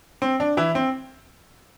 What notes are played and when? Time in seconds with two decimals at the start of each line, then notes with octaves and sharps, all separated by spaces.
0.22 C4
0.40 D4
0.57 E3 E4
0.75 C4